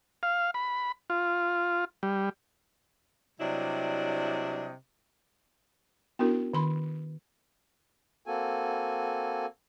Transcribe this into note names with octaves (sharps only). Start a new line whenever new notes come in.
F5
B5
F4
G3
C3 F#3 G3 D4 E4 D#5
B3 C#4 D4 E4 F#4 A#4
D#3 B4 B5 C6
A#3 C4 F#4 A4 G#5